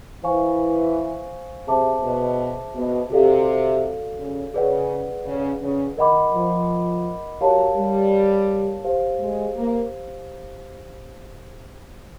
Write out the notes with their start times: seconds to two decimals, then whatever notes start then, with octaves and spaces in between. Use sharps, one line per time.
0.23 E3 C5 F5 G#5 C#6
1.67 C3 G#4 C5 E5 A5 D6
2.03 B2
2.75 B2
3.10 C3 F#4 A4 D5 F5
4.19 C#3
4.53 C#3 G#4 B4 D5 F#5
5.25 C#3
5.61 C#3
5.97 D#3 A#4 D#5 F#5 B5 D6
6.33 F3
7.41 F#3 G4 A#4 C#5 F5 A5
7.77 G3
8.84 G4 C5 F5
9.19 G#3
9.55 A#3